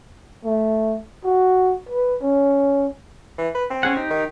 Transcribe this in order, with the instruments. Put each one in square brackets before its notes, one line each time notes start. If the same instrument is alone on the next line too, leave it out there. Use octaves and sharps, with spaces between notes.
[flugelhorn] A3
F#4
B4
C#4
[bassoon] E3
B4
C4
[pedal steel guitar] C#4 G#4 F#5
D#4 G4
[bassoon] D#3